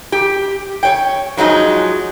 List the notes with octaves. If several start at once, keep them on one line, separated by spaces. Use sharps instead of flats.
G4
C#5 G5
F3 F#3 G#3 D#4